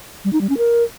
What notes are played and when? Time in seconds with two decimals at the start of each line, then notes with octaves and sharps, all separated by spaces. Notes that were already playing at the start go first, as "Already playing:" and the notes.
0.25 G3
0.33 D#4
0.41 G3
0.49 C#4
0.58 A#4